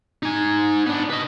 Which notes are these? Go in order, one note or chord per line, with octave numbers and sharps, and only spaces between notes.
D#4 G#5
B3 D4
B4 D#5